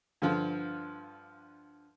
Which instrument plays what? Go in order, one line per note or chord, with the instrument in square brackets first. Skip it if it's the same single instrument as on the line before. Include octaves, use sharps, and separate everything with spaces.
[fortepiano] G2 D3 F3 F5